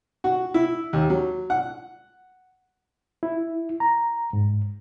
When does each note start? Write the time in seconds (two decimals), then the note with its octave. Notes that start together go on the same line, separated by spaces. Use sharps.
0.24 F#4
0.54 E4
0.93 D#2
1.10 F#3
1.50 F#5
3.23 E4
3.80 A#5
4.33 G#2